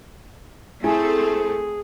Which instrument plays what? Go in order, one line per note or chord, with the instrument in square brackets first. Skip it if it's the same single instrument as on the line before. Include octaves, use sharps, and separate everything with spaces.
[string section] A3 C4 A4 [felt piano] E4 G#5 [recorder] G#4